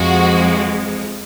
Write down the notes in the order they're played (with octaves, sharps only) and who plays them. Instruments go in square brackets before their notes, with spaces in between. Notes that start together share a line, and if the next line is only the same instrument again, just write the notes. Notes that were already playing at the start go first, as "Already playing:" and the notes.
Already playing: [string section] F2 F3 G#3 F#4